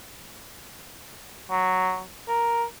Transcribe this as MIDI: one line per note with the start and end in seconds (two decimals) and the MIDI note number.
1.50 2.01 54
2.28 2.64 70